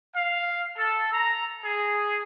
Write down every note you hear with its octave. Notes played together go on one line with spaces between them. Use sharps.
F5
A4
A#5
G#4